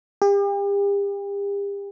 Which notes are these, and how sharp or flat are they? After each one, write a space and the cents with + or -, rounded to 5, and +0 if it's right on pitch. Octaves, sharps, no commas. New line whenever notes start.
G4 +40